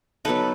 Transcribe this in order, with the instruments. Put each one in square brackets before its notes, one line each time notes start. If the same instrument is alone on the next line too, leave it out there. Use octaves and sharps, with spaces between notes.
[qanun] F#3 B3 D#4 A4 B4